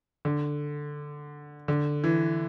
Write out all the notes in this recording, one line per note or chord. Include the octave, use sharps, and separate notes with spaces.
D3
D3
E3